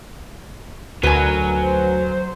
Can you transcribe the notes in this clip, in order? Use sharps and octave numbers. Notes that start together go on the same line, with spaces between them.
D2 F#3 A#4 B4 G#5
C5